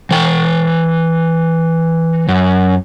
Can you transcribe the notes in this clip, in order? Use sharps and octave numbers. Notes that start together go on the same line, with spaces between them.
E3 G5
F#2